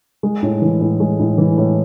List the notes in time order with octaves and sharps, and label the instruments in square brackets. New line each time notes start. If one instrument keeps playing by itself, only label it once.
[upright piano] G#3
A2
E3
A2
G#3
A2
E3
A2